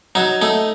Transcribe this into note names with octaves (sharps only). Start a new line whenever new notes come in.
F#3 D#4
A3 D#4